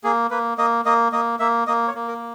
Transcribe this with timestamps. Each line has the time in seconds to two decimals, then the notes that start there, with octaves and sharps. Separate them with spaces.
0.04 A#3 G#4
0.31 A#3 B4
0.58 A#3 D#5
0.85 A#3 D#5
1.12 A#3 D#5
1.40 A#3 E5
1.67 A#3 D#5
1.88 C#5
1.94 A#3
2.08 A#4